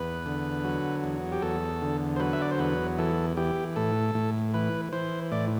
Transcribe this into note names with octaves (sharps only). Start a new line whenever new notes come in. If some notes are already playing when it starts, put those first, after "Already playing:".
Already playing: E2 B4
D3
F#3
E2
G4
E2 A4
D3
C5
F#3 B4
E5
D5
C5
E2 B4
E3 A4
E3 G4
A2 A4
A2
E3 B4
E3 C5
A2 D5